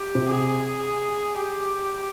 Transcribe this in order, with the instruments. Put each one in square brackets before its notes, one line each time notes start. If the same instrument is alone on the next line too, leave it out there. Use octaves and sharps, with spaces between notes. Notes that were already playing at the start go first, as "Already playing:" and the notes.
Already playing: [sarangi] G4
[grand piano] C3
[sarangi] G#4
G4